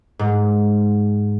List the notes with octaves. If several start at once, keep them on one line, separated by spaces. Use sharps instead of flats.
G#2